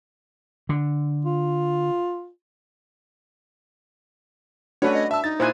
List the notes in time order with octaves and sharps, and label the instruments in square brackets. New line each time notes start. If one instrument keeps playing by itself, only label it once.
[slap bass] D3
[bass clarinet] F4
[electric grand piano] A3 C#4 C#5 [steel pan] D4 F#4 B4
[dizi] D#5
[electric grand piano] E5 E6 [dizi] A5
[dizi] D#4 [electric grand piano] A6
[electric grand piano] A#2 E4 F#6 [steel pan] C5 G#5